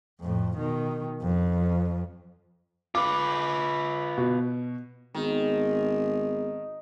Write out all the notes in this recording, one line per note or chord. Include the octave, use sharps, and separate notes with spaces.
F2 A2
B2 D#3
F2
F4 B4 D6
B2
G#1 D#3 B3 G#4